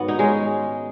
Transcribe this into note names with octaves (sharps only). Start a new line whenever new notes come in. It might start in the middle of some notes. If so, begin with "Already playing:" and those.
Already playing: G#2 D#3 F#3 B3 F#4
D#4
G#3 C#4